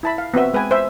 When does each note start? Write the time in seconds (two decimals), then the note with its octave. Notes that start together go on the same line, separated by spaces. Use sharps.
0.03 E4 A5 B5
0.18 F5
0.34 B3 C4 F#4 E5
0.53 G#3 B4 G5 G#5
0.71 C5 E5